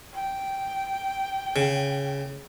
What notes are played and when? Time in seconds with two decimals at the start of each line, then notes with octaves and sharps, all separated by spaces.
0.14 G5
1.56 C#3